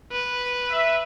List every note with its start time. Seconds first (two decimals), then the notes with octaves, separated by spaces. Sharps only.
0.12 B4
0.70 E5